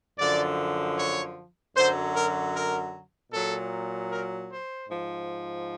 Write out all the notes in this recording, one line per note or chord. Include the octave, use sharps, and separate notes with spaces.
F#2 D3 F3 D5
C#5
F#2 D3 F#3 C5
A#4
A#4
A#2 F#3 A4
A#4
C5
G#2 F3